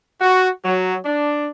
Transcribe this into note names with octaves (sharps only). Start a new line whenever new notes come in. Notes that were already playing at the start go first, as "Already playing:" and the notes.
F#4
F#3
D4